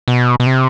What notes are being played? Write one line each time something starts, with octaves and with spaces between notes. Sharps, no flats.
B2
B2
C3